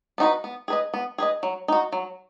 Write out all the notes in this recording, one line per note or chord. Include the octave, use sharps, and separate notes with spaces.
B3 D#4 F#4 B4
B3
G#4 B4 D#5
B3
G#4 B4 D#5
F#3
D#4 F#4
F#3